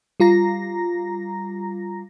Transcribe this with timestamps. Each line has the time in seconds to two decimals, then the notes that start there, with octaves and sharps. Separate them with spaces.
0.20 G3 F4 A#5 A#6